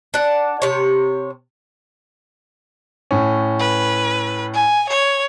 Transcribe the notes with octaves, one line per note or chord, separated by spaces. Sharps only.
D4 F#5
C3 C#5
A2 C#4
B4
G#5
C#5